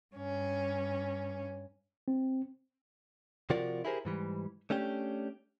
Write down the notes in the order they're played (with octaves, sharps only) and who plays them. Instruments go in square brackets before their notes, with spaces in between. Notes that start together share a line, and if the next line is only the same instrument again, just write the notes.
[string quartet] G2 C#4
[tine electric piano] C4
[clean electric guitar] C3 F3 F4 F#4 A#4 D5
E4 G4 G#4 A#4 C5
G#2 E3 G3
A3 C#4 D4 G4